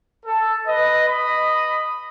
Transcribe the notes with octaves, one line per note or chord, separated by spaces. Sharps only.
A4
B4 D#5
D#5 B5